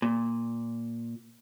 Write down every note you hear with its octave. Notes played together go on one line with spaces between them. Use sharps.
A#2